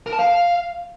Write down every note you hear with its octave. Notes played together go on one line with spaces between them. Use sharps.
A#4
A5
F5